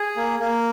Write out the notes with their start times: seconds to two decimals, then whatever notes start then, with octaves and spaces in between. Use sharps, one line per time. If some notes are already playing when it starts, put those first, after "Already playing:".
Already playing: G#4
0.16 A#3
0.40 A#3